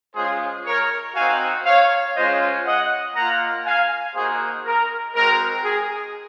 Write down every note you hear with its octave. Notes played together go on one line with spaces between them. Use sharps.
G#3 C#4 F4 G#4 C5
A#4 C#5
C4 D#4 F#4 F5 G#5
C#5 F5
G#3 C#4 F4 C5 D#5
D#5 F#5
A#3 F4 F#5 A#5
F5 G#5
A#3 D#4 F#4 G#4 C5
A#4
G#3 C4 F#4 A#4
G#4